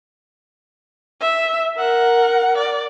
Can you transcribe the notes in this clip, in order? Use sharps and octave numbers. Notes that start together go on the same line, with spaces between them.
E5
A#4 F#5
D5